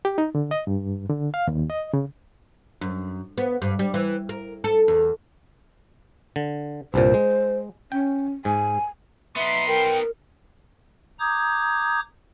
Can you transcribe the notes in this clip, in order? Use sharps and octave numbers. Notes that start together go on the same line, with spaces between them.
G4
D#4
D3
D#5
G2
D3
F5
D#2
D#5
C#3
F#2
B3
G2
G3
E3
A#4
A4
E2
D3
C2 G2 A#2 C5
G#3
C#4 G5
G#2 G#5
B3 D#4 E5 B5 C6
A#4 G5
A#5 D6 D#6 G6 G#6